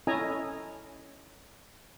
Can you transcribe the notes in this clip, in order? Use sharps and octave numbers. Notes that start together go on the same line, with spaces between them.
C#4 E4 A4 D#5 G#5 A#5